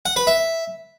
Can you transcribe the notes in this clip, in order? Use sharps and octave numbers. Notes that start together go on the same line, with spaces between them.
F#5
B4
E5